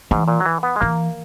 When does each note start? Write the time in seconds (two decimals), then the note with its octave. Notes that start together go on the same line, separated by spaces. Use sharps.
0.11 G#2 E3
0.28 A#2
0.40 F#3
0.46 E3
0.63 B3
0.76 G#3
0.80 E3 A#3